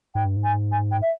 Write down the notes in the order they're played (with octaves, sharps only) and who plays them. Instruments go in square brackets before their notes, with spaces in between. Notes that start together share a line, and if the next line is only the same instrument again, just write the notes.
[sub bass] G#2 [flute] G5
[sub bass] G2
G#2
[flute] G#5
G#5
G5
E5